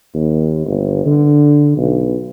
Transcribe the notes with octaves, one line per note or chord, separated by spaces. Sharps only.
D#2
G1
D3
B1